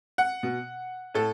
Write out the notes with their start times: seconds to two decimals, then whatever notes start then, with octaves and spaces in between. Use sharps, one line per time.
0.18 F#5
0.43 B2
1.14 A2 A4